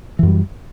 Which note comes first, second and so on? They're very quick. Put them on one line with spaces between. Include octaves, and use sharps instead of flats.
E3 F#2 G3